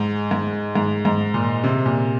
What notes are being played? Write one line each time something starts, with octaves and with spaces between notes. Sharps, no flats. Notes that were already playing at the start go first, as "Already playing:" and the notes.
Already playing: G#2
G#2
G#2
G#2
A#2
C3
A#2